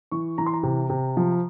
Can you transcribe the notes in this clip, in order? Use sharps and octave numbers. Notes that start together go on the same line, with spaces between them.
E3 C#6
E3 A#5
C6
A#5
C3
C3
F3